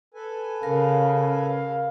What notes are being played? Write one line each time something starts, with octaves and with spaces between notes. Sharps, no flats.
A4 B4 G#5
C#3 A#4 F5
F5